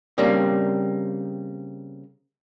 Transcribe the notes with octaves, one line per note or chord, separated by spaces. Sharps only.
C#3 G3 A#3 C4 D4